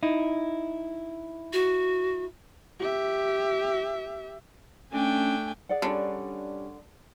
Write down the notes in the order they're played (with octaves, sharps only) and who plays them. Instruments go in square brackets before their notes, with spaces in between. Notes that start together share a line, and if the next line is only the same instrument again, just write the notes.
[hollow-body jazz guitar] D#4 E4
[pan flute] F#4
[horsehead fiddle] G4 E5
[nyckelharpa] A3 D4 [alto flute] C#4 [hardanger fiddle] G5 G#5
[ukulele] G#4 D5 F#5
[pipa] D3 [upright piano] G3 C#4 D4